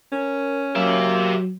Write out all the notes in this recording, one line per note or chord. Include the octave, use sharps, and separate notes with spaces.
C#4 A#4
F#3 A#3 G4 E5